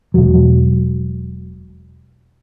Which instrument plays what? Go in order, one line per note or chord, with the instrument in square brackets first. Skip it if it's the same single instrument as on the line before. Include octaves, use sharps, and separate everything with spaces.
[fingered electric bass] E1 F#3